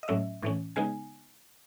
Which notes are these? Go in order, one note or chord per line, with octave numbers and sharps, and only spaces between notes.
D#5
A2 F#3 A3 C#4 E5
A2 E3 A3 C#4
C#3 G#3 B3 D#4 G#5